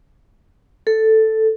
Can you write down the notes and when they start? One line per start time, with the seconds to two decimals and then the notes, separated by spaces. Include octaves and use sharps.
0.87 A4